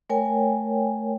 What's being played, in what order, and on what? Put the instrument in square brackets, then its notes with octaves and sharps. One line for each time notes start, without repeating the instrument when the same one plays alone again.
[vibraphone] A3 A#4 C#5 G5 G#5